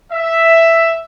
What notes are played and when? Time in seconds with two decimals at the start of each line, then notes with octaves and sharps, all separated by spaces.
0.11 E5